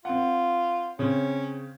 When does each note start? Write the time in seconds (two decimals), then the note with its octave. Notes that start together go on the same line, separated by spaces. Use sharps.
0.05 C4 F4 F#5
0.99 C#3 C4 C#4